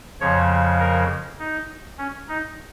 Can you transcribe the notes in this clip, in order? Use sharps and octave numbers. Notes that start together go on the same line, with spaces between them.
F2 C#3 F3 C#5
A#4
D#4
C#4
D#4